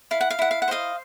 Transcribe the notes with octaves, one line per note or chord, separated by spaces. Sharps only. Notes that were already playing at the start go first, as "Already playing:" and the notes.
E4 F5
F#5
F5
E4 F#5
F5
F#5
C5 D#5 F5